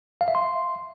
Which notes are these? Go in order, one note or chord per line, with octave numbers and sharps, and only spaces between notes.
F5
E5
C6